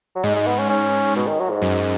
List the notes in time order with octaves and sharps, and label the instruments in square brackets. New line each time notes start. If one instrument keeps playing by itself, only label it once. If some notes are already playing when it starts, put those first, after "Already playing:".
[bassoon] F#3
[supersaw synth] G#2 [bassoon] G#3
[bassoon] G#3
B3
C#4
C#4
B2
D#3
F#3
G#2
[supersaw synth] F#2